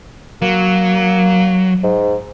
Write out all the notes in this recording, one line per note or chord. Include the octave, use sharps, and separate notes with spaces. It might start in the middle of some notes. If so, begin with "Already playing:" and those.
F#3 A#3
G#2